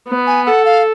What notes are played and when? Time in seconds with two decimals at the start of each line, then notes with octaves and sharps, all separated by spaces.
0.08 B3
0.27 G#5
0.46 A4 F#5
0.65 F5